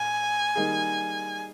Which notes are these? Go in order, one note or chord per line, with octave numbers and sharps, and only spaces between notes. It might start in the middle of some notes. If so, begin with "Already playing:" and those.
Already playing: A#2 G#5
D#3 G3 A#3 D#4 G#4